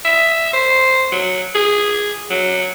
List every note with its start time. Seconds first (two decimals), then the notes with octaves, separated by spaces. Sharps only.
0.05 E5
0.53 C5
1.12 F#3
1.55 G#4
2.30 F#3